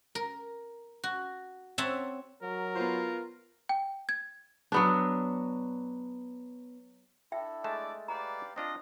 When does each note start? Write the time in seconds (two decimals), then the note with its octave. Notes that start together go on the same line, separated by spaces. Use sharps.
0.15 A#4
1.04 F#4
1.78 C4 C#5 E5 F#5 A5
2.43 F#3 A#4
2.75 B3 F4 C5
3.69 G5
4.09 G#6
4.72 F#3 B3 D4
7.32 D4 E4 A4 E5 G5
7.64 G#3 A3 D5 A5
8.08 G4 B4 D5 F5 A#5
8.56 C4 D4 F4 D#5